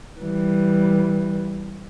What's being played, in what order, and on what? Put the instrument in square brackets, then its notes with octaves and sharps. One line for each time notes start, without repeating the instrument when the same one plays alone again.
[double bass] E3 G3